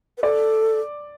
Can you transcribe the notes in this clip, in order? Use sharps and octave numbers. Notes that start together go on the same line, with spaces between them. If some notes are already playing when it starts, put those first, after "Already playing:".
B4
A4 D5